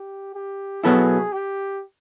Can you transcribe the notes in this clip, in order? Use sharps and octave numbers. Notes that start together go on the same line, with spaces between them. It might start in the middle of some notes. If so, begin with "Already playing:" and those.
Already playing: G4
G4
B2 F#3 B3 E4 G#4 A4
G4